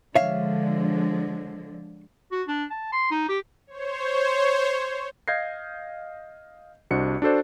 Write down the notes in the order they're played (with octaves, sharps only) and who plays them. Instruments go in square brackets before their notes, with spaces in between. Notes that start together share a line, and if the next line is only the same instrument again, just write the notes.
[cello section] D3 F3 G#3 [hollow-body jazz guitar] C#5 E5 F5
[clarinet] F#4
D4
A5
C6
D#4
G4
[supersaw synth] C5 C#5
[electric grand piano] D#5 F5 G6 G#6 A#6 C7
C2 D4 F#4 C5 D#5 C#7
D4 F#4 A4 C5 D5